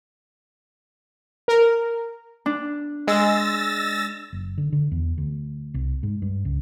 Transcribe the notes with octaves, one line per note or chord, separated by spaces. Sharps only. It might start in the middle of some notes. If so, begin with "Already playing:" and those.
A#4
D4
G#3 E6 A6 A#6
F#1
D3
D3
E2
D2
C2
G#2
G2
C#2